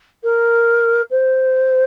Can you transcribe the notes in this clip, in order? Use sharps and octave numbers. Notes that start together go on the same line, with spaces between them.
A#4
C5